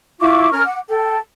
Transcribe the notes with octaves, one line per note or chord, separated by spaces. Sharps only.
E4 F4 C#6 D6
C#4 A#4 F6
F#5 D6
A4 G5